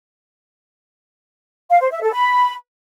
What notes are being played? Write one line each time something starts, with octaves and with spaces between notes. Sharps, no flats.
F5
C5
E5
A4
B5